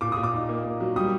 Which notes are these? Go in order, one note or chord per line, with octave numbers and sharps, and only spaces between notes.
A#2 D6
D#6
A#2
D6
D#4
A#3
A#3
F#3
G3 D#6